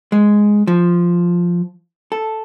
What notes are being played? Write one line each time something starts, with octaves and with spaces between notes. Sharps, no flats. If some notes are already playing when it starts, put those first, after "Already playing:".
G#3
F3
A4